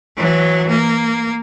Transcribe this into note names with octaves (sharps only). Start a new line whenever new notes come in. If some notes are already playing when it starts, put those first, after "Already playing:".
E3 F#3
A#3